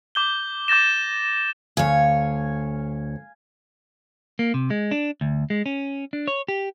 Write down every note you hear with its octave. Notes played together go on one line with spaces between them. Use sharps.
D6 G6 G7
D6 G6 A6 A#6 E7
D2 C#5 F5 G#5
A#3
C3
G#3
D4
D2
G#3
C#4
D4
C#5
G4